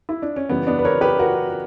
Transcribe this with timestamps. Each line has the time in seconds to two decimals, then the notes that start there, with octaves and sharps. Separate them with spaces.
0.09 E4
0.22 D4
0.36 C#4
0.49 F#2 C#3 E3 G3 B3
0.67 B3 D4
0.79 B4
0.85 A#4 C#5
1.01 G4 B4
1.19 F#4 A#4